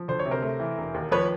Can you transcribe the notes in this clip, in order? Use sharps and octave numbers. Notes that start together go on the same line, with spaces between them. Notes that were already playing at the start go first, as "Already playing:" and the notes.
Already playing: F3
D2 C5
C#5
C3
A#4 C5
A3
E3
E1
D#2
F3 B4 C#5